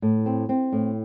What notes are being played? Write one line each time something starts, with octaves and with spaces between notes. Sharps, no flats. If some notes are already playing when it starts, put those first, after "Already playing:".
A2
C4
C4
A2